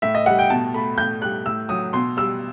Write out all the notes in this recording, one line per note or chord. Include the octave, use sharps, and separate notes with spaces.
A2 E5
D#5
G3 F#5
G5
B2 A5
A3 B5
A2 G6
G3 F#6
A2 E6
F#3 D#6
B2 C6
G3 E6